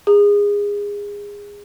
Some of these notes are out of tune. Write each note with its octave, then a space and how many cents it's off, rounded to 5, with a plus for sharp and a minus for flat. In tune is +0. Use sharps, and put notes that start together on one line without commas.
G#4 -25